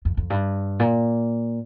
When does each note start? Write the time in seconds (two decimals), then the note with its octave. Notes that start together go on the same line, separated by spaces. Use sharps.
0.05 F2
0.17 F2
0.30 G2
0.80 A#2